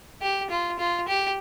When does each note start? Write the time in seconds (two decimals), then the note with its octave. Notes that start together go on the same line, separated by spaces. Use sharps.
0.22 G4
0.50 F4
0.79 F4
1.08 G4